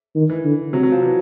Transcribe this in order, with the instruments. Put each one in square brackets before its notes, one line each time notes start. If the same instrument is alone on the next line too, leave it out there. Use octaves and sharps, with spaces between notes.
[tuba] D#3
[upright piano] E3
[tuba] D3
[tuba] C3 [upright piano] F#3
[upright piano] F#3
F3
E3